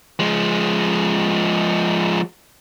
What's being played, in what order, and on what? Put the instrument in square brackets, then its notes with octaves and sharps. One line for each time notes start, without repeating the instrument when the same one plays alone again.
[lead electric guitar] F3 G#3